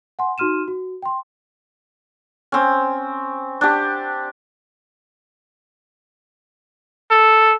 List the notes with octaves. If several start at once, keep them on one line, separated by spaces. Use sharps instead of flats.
F#5 G#5 C6
D#4 F#4 C6 F6 D#7 E7
F#4
G5 C6
C4 C#4
D4 G4
A4